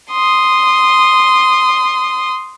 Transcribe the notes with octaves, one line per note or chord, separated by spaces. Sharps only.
C6 D#6